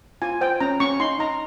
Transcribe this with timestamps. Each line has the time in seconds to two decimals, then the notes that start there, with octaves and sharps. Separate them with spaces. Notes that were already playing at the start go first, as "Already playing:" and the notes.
0.22 F4 G#5
0.41 C5 G5
0.60 C#4 A#5
0.80 C#4 C#6
1.00 D#4 C6
1.19 D#4 A#5